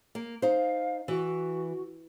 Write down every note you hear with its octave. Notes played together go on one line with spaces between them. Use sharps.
A#3
D#4 C5 F5
E3 F#4